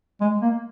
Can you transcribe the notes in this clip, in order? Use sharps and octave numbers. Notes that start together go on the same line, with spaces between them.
G#3
A#3